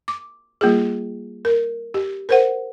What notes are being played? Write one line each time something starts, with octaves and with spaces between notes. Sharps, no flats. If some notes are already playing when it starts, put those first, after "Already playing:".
D6
G3 A#3 F4 G#4
A#4
G4
A#4 C5 F#5